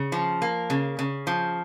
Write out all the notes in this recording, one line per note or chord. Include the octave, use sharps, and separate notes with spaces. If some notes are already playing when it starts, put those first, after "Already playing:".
Already playing: C#3
F3
A#3
C#3
C#3
F3